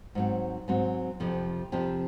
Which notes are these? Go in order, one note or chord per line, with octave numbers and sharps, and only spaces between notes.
G#2 F#3 C4
G#2 F#3 C4
F2 C3 F3
F2 C3 F3